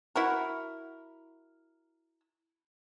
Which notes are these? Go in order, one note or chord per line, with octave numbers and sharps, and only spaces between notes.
E4 F#4 A#4